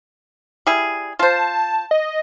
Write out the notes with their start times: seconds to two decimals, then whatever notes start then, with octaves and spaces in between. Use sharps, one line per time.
0.67 G3 E4 G#4
1.19 F4 C5 A5
1.91 D#5